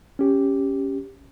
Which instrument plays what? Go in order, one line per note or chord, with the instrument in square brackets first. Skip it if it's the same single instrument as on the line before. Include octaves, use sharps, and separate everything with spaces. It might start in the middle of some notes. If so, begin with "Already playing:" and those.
[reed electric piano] C#4 G4